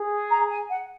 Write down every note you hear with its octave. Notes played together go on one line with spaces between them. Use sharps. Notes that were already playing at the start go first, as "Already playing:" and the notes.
Already playing: G#4
A#5
G#5
F#5